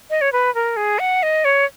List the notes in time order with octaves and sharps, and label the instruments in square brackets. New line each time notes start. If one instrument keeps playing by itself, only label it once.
[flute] D#5
C#5
B4
A#4
G#4
F#5
D#5
C#5